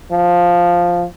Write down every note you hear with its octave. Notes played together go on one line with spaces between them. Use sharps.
F3